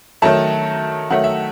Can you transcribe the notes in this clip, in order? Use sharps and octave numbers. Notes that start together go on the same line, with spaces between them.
D#3 F#3 A3 A5
D#3 F#3 A3 F#5
E5